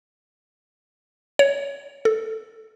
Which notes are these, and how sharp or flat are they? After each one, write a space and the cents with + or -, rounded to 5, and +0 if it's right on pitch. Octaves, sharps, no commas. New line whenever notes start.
C#5 +10
A4 -5